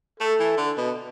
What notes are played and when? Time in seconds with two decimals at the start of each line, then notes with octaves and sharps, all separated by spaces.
0.20 A3 A4
0.40 E3
0.57 D3
0.77 B2